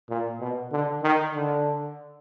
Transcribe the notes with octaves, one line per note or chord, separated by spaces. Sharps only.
A#2
B2
D3
D#3
D3